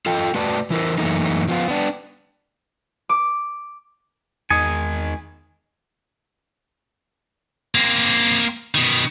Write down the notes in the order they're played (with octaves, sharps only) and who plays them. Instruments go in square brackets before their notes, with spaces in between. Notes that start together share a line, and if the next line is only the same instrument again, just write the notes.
[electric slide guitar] F4 A4 D#5 G5
A3 F#4 B4 D5 A5
E3 E4 A#4 C5
F#2 E3 A3 A#3 D#4
F3 B3 F4
B3 D4
[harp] D6
[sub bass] E2 [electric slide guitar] D#3 G#3 D#4 [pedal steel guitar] G#5 [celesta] D#6 C#7
[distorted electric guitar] A#3 C4
B2 D#3